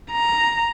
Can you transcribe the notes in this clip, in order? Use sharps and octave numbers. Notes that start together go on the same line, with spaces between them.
A#5